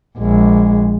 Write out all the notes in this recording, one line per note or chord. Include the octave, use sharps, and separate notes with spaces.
A#1 G#3